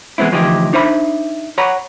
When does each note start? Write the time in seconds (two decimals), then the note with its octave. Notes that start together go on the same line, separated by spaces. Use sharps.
0.18 E3 G#3 B3 C4 E4
0.32 D2 E3 F3 D#4 E4 G4
0.73 D4 D#4 C5 E5 G#5 B5
1.58 C#5 F#5 A#5 B5